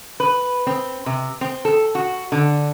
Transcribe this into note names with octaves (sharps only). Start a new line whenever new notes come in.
B4
C4
C3
C4
A4
F#4
D3